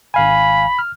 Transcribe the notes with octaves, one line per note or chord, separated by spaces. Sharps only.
G#1 F5 G#5 B5
F6